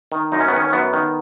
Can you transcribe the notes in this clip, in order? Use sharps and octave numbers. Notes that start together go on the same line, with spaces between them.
D#3
F#2 D#4
C#4
B3
D#3 C#4
C#4
F#2 B3
D#3